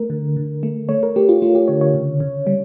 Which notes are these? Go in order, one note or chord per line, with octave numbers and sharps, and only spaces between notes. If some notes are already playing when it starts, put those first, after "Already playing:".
Already playing: A3 A#4
D3
D3
A3
A3 C#5
A#4
A3 G4
F4
A3 F4
G4
D3 C#5
C#5
C#3
C#3
G3